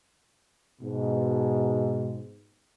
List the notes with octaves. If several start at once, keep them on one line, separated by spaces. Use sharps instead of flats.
G#2 B2